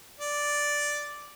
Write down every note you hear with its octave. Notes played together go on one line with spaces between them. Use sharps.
D5